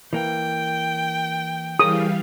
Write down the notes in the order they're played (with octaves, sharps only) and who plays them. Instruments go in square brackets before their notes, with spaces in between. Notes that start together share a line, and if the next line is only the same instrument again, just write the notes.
[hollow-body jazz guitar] E3 A#3 [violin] G5
[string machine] E3 G3 F5 [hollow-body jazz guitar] G#4 A#4 C#5 [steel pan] D#6